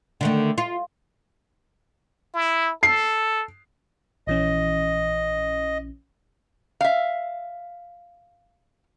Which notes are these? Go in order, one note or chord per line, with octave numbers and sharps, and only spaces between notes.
D3 D#3 A3
F4
E4
A4 C7
A#1 E3 C#4 D#5
E5 F5